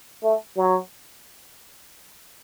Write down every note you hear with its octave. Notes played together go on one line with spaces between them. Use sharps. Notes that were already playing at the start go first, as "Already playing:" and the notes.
A3
F#3